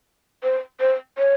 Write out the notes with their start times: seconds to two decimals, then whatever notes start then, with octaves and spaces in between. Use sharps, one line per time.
0.43 C5
0.80 C5
1.18 C#5